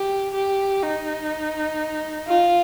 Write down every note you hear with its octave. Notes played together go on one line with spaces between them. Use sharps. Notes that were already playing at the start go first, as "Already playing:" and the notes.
Already playing: G4
G4
D#4
F4